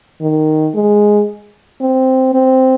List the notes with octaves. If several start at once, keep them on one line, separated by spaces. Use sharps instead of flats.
D#3
G#3
C4
C4